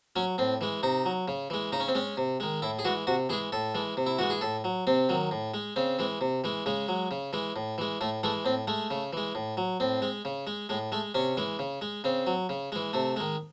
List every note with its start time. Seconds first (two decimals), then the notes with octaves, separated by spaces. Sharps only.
0.16 F#3 C#4
0.38 A2 C4
0.61 E3 G#3
0.83 C3 D#4
1.05 F#3
1.28 C#3
1.50 E3 G#3
1.72 C#3 D#4
1.80 C#4
1.88 C4
1.95 G#3 C#4
2.17 C3
2.40 D#3 G#3
2.62 A2 E4
2.79 G#4
2.85 E3 G#3 F#4
3.07 C3 F#4
3.29 E3 G#4
3.33 G#3
3.52 A2 A4
3.74 E3 G#3
3.97 C3
4.06 E4
4.18 E3 G#3 F#4
4.30 G#4
4.41 A2 A4
4.64 F#3
4.87 C3 C4
5.09 D#3 F#3
5.31 A2
5.54 G#3
5.76 C#3 C4
5.99 E3 G#3
6.21 C3
6.44 E3 G#3
6.66 C#3 G#3
6.88 F#3
7.11 C#3
7.33 E3 G#3
7.56 A2
7.78 E3 G#3
8.01 A2 A3
8.23 E3 G#3 A3
8.45 A2 C4
8.67 G#3 A3
8.90 C#3
9.13 E3 G#3
9.35 A2
9.57 F#3
9.80 A2 C4
10.02 G#3
10.25 C#3
10.47 G#3
10.69 A2 G#3
10.92 G#3 A3
11.15 C3 C#4
11.37 E3 G#3
11.59 C#3
11.82 G#3
12.04 C#3 C4
12.27 F#3
12.49 C#3
12.72 E3 G#3
12.93 C3 A3
13.17 D#3 G#3